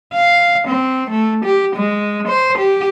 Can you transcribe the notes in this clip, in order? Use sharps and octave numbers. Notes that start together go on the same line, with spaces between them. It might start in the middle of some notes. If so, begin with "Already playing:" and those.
F5
C4
A3
G4
G#3
C5
G4